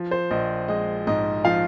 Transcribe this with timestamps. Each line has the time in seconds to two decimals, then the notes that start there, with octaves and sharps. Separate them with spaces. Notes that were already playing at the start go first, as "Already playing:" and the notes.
Already playing: F3
0.11 C5
0.31 A#1 D#5
0.68 G#3 D#5
1.07 G#2 D#5
1.45 F3 F5